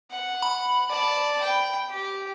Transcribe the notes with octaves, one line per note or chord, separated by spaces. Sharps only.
F#5
B5
D5 A5
G5
G4